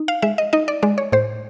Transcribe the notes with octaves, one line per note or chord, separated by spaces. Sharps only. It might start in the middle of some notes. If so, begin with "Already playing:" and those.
Already playing: D#4
F5
G#3 E5
D#5
D#4 D#5
D5
G#3 D5
C#5
A2 C5